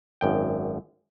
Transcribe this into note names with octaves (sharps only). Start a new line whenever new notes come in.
G#1 F#2 G5